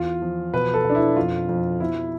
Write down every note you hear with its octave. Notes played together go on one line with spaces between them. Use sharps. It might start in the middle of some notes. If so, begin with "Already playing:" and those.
Already playing: E2 F4
F3
B2 B4
A4
B2
D4
E4
F2 F4
F2
B2 E4